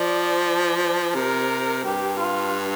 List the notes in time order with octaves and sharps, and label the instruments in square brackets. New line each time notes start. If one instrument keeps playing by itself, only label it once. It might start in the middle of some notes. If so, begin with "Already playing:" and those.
Already playing: [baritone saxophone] F3 [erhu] D5
[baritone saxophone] C3 [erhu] A#4
[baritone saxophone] G2 [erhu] G4
[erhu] F4